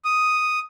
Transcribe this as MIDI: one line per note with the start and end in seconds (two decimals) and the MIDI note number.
0.05 0.59 87